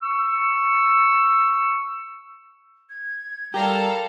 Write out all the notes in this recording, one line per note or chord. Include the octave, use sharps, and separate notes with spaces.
C#6 E6
G#6
G3 G4 A4 A#4 F5 A#5